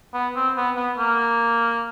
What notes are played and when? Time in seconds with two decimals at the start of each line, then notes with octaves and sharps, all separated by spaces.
0.14 B3
0.36 C4
0.56 B3
0.77 B3
0.98 A#3